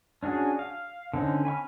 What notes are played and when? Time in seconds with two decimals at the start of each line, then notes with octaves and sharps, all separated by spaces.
0.23 C#4 D4 F#4 G#4
0.59 F5
1.13 D3 C4 C#4 D#4
1.45 G#5 B5 C#6 F6